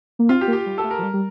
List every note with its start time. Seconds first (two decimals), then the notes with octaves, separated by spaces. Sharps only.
0.19 A#3
0.29 C4 F4
0.41 G4
0.48 A#3
0.53 G4
0.66 G3
0.78 A4
0.84 A3
0.91 A#4
0.98 F3
1.03 G3
1.14 G3